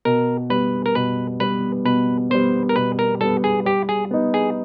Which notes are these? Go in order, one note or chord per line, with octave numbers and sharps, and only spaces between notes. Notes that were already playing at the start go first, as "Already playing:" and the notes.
B2 A#4
G3 B3 B4
A#4
B2 B4
G3 B3 B4
B2 B4
G3 B3 C5
A#4
B2 B4
A#4
G3 B3 A4
G#4
G3 G4
G#4
B3 D#4
G#4